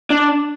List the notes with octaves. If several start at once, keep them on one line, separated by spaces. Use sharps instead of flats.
D4